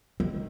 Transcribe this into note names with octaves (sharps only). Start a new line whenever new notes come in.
D#3